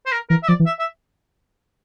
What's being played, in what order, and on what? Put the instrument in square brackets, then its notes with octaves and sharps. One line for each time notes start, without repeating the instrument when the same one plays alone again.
[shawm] C5
A#4
[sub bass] E3 [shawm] A#4
[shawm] E5
[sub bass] F3 [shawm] D5
[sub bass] E3
[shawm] E5
E5